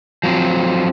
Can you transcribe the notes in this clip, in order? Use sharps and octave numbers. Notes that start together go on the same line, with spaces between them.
F3 F#3 C4